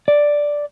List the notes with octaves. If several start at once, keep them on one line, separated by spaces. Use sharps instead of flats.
D5